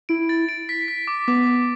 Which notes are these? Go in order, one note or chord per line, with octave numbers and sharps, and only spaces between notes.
E4 D7
A6
D7
B6
B6
D6
B3 D6
D6